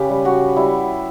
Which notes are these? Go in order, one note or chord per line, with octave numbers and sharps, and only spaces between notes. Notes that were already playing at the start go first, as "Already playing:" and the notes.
Already playing: C#3 G4 B4
G3
F#4
G3 E4